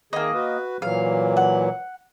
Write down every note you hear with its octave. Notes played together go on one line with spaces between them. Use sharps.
D#3 A#3 G#4 D#5
F#4 B4
A#2 E3 F#3 F5
F#5